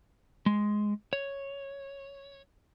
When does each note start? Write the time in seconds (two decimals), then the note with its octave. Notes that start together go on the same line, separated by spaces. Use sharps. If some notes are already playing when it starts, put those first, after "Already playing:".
0.46 G#3
1.13 C#5